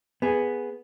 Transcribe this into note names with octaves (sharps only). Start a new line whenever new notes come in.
B3 G#4